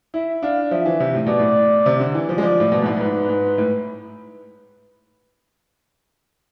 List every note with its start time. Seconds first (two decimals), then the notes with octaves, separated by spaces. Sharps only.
0.14 E4 E5
0.42 D4 F5
0.71 F3 E5
0.86 E3
1.00 C3
1.15 A2
1.26 B2 D5
1.39 A2
1.86 C3
2.00 D3
2.15 E3
2.29 F3
2.38 G#3
2.43 F3 D5
2.60 A2
2.72 B2
2.82 G#2
2.86 A2
2.97 A2
3.00 G#2 B4
3.29 G#2
3.58 A2